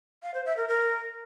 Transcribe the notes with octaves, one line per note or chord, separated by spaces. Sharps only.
F5
C5
E5
A#4
A#4